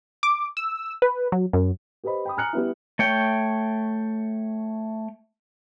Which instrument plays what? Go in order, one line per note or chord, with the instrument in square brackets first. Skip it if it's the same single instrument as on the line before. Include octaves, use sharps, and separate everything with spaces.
[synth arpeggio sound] D6
E6
B4
F#3
F#2
[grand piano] G4 B4 C5 D#5 B5
G5 B5 D#6
G#5 A#5 F6 F#6 C#7 F#7
G3 B3 E4
[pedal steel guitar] A3 C#5 G5